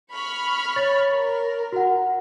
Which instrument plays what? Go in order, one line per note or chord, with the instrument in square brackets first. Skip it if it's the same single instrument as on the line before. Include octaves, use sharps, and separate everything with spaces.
[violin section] B5 C#6 F6
[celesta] C#5 A6
[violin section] A#4
[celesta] F#4 F#5